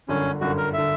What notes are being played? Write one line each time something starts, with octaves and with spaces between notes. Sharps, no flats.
G1 F#2 D3 C#4
G1 F#2 D3 F#4
A#4
D3 E5